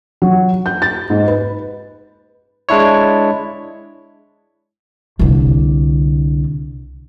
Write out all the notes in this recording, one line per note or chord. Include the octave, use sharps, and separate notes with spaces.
F#3
G6
A6
G#2
B4
G#3 D4 E4 C#5
C2 D3